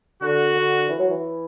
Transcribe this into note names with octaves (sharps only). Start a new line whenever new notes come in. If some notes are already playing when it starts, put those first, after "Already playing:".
D3 F#4
D3
E3
F#3
E3